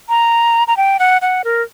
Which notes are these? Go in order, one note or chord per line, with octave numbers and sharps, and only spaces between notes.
A#5
A#5
G5
F#5
F#5
A#4